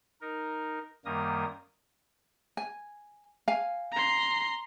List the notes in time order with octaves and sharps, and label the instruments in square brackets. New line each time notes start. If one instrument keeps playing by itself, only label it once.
[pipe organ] D#4 A#4
F#2 D#3 G3 A#3 A#4 D#6
[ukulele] G#5
F5 G#5
[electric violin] A#5 C6